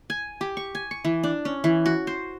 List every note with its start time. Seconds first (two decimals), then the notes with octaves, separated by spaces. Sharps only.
0.10 G#5
0.41 G4
0.57 C#6
0.75 G#5
0.91 C#6
1.05 E3
1.23 D4
1.45 C#4
1.64 E3
1.86 F#4
2.07 C5